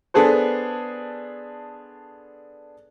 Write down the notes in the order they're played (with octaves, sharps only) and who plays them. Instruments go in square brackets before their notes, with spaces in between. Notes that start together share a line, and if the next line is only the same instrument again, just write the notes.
[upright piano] B3 D4 G#4 A4 C5